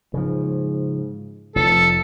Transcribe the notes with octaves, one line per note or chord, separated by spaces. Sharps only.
G#2 C#3 F3
F1 F3 A4